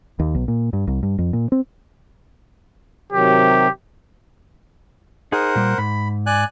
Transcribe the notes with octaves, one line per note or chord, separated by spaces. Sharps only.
D#2
B1
A#2
G2
C2
G2
F2
A#2
C4
C3 D#3 F#3 G4
D#4 G#4 A#4 C5 F#5
A#2 G3
G#2 B5
D5 G#5 F#6